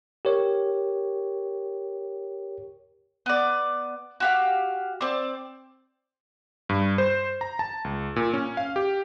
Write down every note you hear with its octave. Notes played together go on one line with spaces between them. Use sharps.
G4 A#4 C#5
B3 D5
F#4 G4 F5
C4 D5
G2
C5
A#5
A5
C#2
A#2
C#4
F5
G4